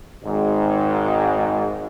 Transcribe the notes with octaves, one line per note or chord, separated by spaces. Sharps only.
G#1 G#2